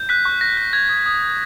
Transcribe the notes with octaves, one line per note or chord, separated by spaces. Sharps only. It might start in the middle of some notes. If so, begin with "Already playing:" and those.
Already playing: G6
F#6 B6
C#6
C#6 A#6
F#6
G6 G#6
D#6
D#6
G6